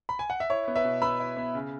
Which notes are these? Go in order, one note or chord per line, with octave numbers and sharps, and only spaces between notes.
B5
G#5
F#5
E5
E4 C#5
B3
B4 E5
B2
B3 B5 E6
E4
B3
C#3